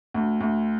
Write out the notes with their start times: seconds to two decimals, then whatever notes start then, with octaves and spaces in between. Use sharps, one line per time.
0.14 D2
0.41 D2